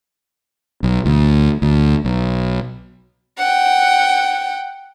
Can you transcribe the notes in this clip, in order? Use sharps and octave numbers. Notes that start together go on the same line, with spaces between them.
B1
D2
D2
B1
F#5 G5